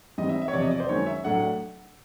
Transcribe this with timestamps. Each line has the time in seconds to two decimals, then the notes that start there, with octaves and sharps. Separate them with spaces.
0.18 G#2 E3 G3 C4 D#5
0.29 E5
0.42 E5
0.48 C#5
0.53 E2 C3 F3 D5
0.62 D#5
0.71 D5
0.80 C5
0.89 F#2 D#3 G#3 C#4 C#5
1.06 E5
1.24 A2 F#3 A3 D4 F#5